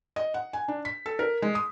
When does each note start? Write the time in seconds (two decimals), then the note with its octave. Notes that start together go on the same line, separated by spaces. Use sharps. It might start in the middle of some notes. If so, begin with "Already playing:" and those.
0.16 D#5
0.34 F#5
0.53 G#5
0.68 D4
0.85 B6
1.06 A4
1.19 A#4
1.42 G#3
1.55 D#6